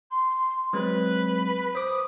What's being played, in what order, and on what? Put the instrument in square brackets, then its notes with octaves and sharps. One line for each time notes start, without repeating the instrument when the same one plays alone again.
[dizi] C6
[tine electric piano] F#3 G#3 C4 [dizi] B4
[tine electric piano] C5 D6 [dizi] D#6